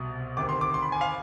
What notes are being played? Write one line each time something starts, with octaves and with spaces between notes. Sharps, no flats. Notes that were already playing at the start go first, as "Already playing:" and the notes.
Already playing: C2 B2 D#6
D2 C3 D#3 D6
C6
D6
C6
B5
G#5
F5